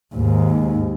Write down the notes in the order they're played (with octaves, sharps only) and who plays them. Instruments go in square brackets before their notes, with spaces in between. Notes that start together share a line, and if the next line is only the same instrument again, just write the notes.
[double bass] D#2 G#2